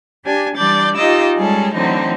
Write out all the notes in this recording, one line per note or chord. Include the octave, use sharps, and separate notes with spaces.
D4 G4 G#5
E3 G3 D4 D5 G6 A6
D#4 F4 G4 D#5 D6 E6
G3 G#3 C#4 G#4 A4
A2 D3 E3 F#3 C4 D#4